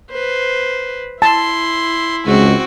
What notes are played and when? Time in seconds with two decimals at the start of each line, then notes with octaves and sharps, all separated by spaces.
0.11 B4 C5
1.22 E4 A5 C6
2.26 C#2 G#3 C4 F#4